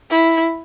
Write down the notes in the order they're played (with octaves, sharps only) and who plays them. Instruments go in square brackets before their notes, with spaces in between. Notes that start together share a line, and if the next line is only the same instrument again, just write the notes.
[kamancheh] E4